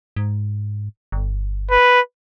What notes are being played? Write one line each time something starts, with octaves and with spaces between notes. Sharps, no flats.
G#2
G1
B4